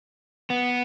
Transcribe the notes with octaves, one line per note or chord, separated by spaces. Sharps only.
B3